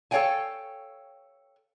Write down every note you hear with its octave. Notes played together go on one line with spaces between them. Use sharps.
A4 C#5 D5 F5 G5 G#5